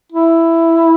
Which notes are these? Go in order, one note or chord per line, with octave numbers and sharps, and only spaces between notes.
E4